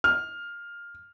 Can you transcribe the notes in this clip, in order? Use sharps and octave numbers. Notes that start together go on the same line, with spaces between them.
F6